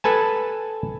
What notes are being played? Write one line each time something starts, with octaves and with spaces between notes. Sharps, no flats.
A4 B4 G#5 A5